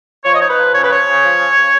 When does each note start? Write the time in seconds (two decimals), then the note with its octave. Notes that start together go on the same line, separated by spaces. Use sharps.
0.24 F3 C#5
0.35 D#5
0.41 D#4 C#5
0.49 B4
0.58 F3
0.74 C#3 C#5
0.84 B4
0.90 F3 C#5
1.07 C#3
1.23 F3
1.39 C#3
1.56 C#3